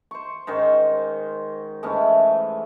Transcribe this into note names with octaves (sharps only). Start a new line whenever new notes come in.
C5 C#6
G#2 D#3 C#4 C5
G#2 E3 A3 C#4